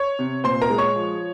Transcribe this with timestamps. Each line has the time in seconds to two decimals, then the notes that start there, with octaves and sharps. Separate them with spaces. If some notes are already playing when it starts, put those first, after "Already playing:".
Already playing: C#5 C#6
0.19 C3
0.44 A#2 C5 C6
0.62 A#4 A#5
0.70 G#3
0.78 C#5 C#6
0.96 F3